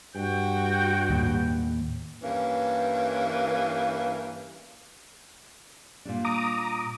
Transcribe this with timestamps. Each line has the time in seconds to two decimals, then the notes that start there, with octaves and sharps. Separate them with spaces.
0.16 G2 F#4 G5
1.09 D#2 A2
2.23 G2 E3 A#3 C#4
6.05 A#2 G3 D4
6.25 A#5 D6 D#6